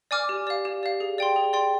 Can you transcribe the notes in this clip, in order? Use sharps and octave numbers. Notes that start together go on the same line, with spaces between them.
D5 G#5 D6 F6
G4
D5 F5
G4
D5 F5
G#4
D5 G5 C6
G#4
D5 G5 C6